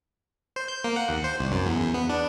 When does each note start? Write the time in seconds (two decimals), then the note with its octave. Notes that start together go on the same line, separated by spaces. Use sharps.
0.56 C5
0.68 G6
0.84 A#3
0.96 F#5
1.09 D#2
1.24 C5
1.39 C2
1.52 F#2
1.66 E2
1.80 E2
1.94 B3
2.10 D4